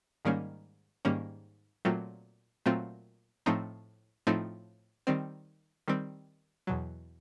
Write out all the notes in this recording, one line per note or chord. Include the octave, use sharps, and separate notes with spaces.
G#2 D#3 G3 A#3 C#4
G#2 D#3 G3 A#3 C#4
A#2 F#3 A3 C4 F4
A#2 F#3 A3 C4 F4
A2 F3 A3 C4 D#4
A2 F3 A3 C4 D#4
D#3 G3 C4
D#3 G3 C4
E2 B2 F#3